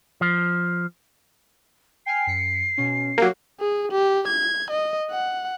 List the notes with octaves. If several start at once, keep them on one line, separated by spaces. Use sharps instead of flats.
F3
G5 G#5 F6 C7
F#2 B6 C#7
B2 C#4
F#3 A#3 G4
G#4
G4
G#6
D#5
F#5